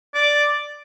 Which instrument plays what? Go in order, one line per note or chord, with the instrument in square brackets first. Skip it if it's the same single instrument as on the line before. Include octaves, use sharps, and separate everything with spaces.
[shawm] D5